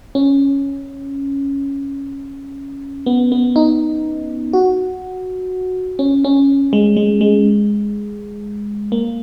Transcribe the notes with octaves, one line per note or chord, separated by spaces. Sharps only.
C#4
B3
B3
D#4
F#4
C#4
C#4
G#3
G#3
G#3
A#3